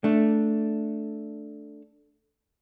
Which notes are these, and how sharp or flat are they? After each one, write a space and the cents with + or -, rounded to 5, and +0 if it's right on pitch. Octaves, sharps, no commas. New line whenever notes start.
A3 +0 D4 +0